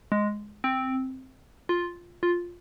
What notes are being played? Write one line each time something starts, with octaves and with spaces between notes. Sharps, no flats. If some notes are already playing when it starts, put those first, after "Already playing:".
G#3
C4
F4
F4